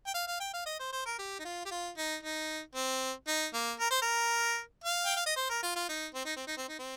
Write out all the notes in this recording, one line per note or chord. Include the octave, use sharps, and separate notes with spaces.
G5
F5
F5
G5
F5
D#5
C5
C5
A#4
G4
D#4
F4
G4
F4
D#4
D#4
C4
D#4
A#3
A#4
C5
A#4
F5
G5
F5
D#5
C5
A#4
F4
F4
D#4
C4
D#4
C4
D#4
C4
D#4
C4